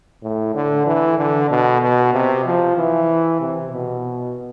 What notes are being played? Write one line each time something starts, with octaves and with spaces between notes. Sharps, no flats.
A2
D3
E3
D3
B2
B2
C3
F3
E3
C3
B2